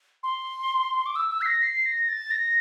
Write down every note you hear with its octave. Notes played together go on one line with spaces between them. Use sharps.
C6
D6
E6
E6
C7
A#6
C7
A#6
A6
A#6